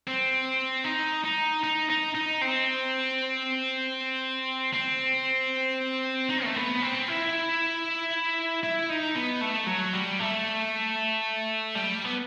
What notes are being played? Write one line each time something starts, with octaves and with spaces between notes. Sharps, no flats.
C4
D#4
D#4
D#4
D#4
D#4
C4
C4
D#4
A3
B3
C4
E4
E4
D#4
B3
A3
F#3
G3
A3
G3
B3